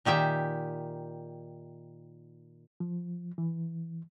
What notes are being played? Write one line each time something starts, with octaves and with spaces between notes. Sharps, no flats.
A#2 D#3 G4 E5
F3
E3